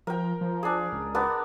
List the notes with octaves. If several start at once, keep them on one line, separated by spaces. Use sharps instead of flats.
F3 A#4 G5
F3
D4 G#4
C#2
B3 D4 A#4